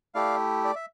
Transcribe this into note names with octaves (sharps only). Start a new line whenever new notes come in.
A3 E4 G4 D5 F5
D5
E5